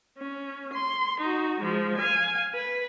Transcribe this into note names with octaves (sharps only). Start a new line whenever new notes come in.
C#4
C6
D#4 F#4
F3 G#3
F5 G#5
B4